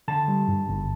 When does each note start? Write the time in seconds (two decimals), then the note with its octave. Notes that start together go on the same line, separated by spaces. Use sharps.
0.08 D3 A5
0.28 G3
0.48 G2
0.68 G1